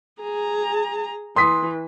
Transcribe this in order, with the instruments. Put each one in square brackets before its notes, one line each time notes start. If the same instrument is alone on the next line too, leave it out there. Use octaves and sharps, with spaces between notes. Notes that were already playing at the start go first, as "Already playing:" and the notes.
[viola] G#4 A#5
[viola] E3 [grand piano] C6 D#6 B6